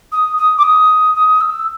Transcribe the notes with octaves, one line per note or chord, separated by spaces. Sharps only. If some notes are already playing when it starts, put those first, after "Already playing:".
D#6
D#6
D6
D#6
D#6
E6